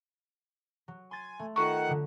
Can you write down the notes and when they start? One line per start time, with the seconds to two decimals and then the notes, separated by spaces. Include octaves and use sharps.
0.88 F#3
1.11 G#5 C6 A6
1.39 A3
1.56 D#3 F4 A4 F#5 A#5 C#6
1.88 D3 F#3